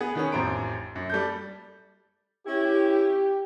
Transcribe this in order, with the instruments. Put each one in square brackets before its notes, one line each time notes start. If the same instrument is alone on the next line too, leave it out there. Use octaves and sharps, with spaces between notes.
[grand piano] B3 G#4
D#3 B3 C#4
A1 F2 C5 A#5 D7
F#2
G3 A4 G6
[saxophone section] C#4 E4 [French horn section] G4